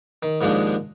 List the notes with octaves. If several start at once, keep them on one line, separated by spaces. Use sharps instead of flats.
D#3
D#2 G#2 F3 G#3 D4